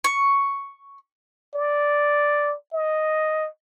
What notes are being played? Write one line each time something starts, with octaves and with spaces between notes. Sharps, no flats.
C#6
D5
D#5